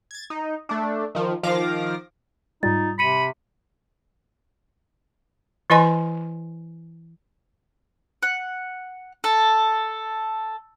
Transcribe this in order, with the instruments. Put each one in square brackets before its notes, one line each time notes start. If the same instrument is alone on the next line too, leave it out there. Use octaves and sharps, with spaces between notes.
[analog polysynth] G#6 A6
D#4
A3 D4
D#3 F3
D#3 F3 F5 D6 A#6
[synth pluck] G#2 G3 [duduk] D#4 [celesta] F4 A6
[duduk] C3 [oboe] B5 [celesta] C#7 D#7
[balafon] E3 E4 B4 D#5 G#5 C6
[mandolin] F#5
A4